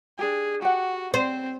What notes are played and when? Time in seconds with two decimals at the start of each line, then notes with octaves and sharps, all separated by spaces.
0.19 D4 G4 G#4
0.62 F#4 G4 F#5
1.14 C4 C5